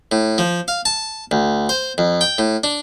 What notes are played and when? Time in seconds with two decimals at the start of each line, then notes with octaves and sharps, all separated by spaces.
0.12 A2
0.38 F3
0.68 F5
0.85 A5
1.31 D2
1.69 C5
1.98 F2
2.21 G5
2.38 A2
2.64 D4